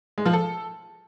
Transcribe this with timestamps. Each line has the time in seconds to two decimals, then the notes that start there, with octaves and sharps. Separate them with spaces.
0.18 G#3
0.25 F3
0.33 A4